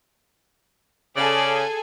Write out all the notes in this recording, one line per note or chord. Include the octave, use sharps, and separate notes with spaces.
C#3 G#4 A4 D5 G#5